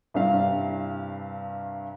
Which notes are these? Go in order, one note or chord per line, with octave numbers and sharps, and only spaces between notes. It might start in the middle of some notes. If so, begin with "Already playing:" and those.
C2 G2 D4 F5